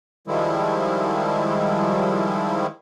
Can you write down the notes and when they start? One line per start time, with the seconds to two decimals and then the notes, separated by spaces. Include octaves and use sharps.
0.27 D#3 F3 G3 G#3 E4